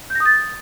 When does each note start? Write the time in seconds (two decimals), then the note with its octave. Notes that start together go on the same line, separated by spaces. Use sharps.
0.10 G6
0.15 A#6
0.20 D#6
0.26 A6